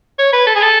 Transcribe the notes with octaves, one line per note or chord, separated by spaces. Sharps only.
C#5
B4
A4
G#4
A4